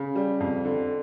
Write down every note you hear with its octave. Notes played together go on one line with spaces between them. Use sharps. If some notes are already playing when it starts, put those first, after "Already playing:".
Already playing: C#3
G3
F2
D3